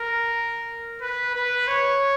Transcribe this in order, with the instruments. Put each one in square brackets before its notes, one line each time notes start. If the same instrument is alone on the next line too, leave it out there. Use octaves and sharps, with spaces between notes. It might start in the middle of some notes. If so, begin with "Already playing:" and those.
Already playing: [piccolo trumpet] A#4
B4
B4
C#5